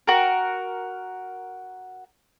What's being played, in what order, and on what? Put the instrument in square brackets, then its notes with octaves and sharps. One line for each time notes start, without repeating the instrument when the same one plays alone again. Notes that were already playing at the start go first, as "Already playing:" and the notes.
[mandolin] F#4 A#4